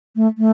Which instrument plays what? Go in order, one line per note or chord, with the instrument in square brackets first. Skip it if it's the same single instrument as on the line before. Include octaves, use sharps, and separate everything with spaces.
[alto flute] A3
A3